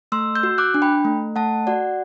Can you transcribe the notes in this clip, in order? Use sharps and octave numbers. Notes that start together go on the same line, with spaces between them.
A3 C6 E6
E6 G6
F#4
D6 F#6
D4
G5 B5
A3
A3 F#5 A5
F#4 D5 F#5